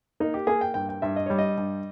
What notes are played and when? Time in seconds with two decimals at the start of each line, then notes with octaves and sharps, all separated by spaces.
0.20 A#3 D#4
0.34 G4
0.47 A#3 G#4
0.61 G5
0.74 G2 G5
0.89 G5
1.02 G2 E5
1.16 D#5
1.26 G3 C#5
1.38 D#5
1.57 G2